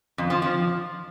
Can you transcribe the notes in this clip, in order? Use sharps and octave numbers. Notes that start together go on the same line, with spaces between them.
F2
F3
F3